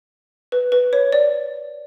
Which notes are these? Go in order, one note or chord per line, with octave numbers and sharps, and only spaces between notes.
B4
B4
C#5
D5